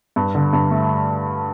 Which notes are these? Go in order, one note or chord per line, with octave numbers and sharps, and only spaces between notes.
G2
D3
G2
A3